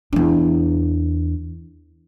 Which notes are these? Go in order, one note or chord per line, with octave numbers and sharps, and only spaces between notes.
E2 D4